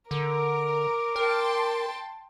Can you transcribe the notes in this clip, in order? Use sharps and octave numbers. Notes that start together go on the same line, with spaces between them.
D3 A#4 D6
A#4 G5 A5 C6